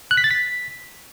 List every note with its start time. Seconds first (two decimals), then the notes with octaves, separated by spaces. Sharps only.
0.11 F#6
0.17 B6
0.24 A6
0.31 B6